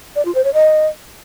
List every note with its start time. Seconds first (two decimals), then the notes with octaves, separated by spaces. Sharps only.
0.16 D5
0.25 F4
0.35 C5
0.44 C#5
0.54 D#5